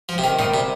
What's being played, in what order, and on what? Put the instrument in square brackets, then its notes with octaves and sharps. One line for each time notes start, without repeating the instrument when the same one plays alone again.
[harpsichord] F3
C3
D#3
[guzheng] A#2 G3 D#4 C5 D#5 [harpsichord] D#3
[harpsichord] C3